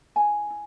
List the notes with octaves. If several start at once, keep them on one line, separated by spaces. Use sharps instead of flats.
E4 G#5
E4